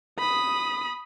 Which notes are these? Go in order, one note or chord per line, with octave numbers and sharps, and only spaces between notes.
B5 D#6